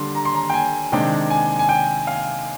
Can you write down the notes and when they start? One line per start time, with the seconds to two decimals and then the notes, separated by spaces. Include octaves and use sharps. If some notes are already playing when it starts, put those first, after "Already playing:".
Already playing: D3 G3 D4 C6
0.15 A#5
0.25 C6
0.35 A#5
0.50 G5
0.54 G#5
0.92 C3 D#3 G#3 D4 G5
1.30 G#5
1.59 G#5
1.69 G5
2.07 F5